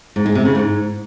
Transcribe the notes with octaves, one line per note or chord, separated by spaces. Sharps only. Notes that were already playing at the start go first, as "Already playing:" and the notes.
G#2
G#3
C3
C#3
G#2